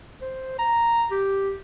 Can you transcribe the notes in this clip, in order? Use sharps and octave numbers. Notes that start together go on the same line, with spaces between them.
C5
A#5
G4